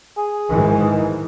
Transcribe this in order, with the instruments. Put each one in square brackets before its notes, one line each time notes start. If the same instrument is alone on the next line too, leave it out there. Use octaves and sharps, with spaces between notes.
[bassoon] G#4
[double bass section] G#2 D#3 E3